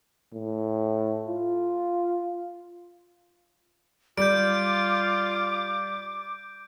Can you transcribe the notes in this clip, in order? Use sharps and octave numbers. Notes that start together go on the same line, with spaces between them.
A2
F4
G3 F4 D6 G6 D7